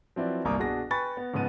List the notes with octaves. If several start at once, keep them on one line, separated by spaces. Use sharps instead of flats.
F3 F#3 C4 E4 B4 D5
G1 C2 A#3 A#5 D6 D#6
B2 D4 F#4 G#4 A#6
B4 G5 G#5 B5 C#6 A6
B3
G#2 C#3 F3 B3 D#7